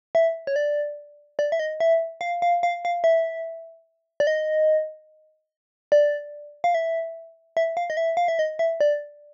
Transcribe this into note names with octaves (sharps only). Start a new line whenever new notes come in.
E5
C#5
D5
D5
E5
D#5
E5
F5
F5
F5
F5
E5
D5
D#5
D5
F5
E5
E5
F5
D#5
E5
F5
E5
D#5
E5
D5